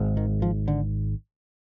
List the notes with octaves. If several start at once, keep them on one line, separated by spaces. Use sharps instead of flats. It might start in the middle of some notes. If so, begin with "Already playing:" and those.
Already playing: G#1 G#2
D#3
F3
D3